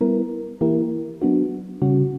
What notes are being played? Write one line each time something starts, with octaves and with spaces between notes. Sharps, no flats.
G3 B3 E4 A#4
E3 A#3 E4 G4 A#4
F#3 B3 D4 F#4
C#3 G3 C#4 F#4